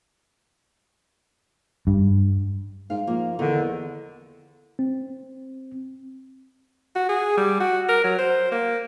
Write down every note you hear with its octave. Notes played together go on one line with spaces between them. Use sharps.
G2
G#2 F5
F3 A#3
E2 D3 D#3
C4
F#4
G#4
G3
F#4
A#4
F#3
C5
A#3